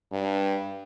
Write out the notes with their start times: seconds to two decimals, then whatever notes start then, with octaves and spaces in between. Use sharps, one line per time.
0.12 G2